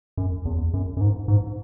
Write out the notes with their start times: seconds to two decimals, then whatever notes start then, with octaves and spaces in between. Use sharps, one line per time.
0.17 F#2
0.45 E2
0.74 F#2
0.97 F#2
1.01 G#2
1.28 G#2